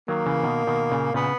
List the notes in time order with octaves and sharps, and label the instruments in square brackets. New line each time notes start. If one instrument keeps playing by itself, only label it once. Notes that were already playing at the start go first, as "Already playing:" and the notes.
[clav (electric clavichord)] D#3 F#3 [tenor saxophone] A#3
[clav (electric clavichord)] C#3 E3
B2 D#3
B2 D#3
A#2 C#3
[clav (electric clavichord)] A#2 C#3 [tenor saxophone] B3